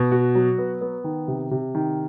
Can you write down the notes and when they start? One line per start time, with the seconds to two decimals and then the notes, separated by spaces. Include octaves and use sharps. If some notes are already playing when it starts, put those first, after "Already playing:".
Already playing: B2
0.12 F#4
0.35 F#3
0.58 B3
0.81 B3
1.04 D#3
1.28 C3
1.51 C3
1.75 D#3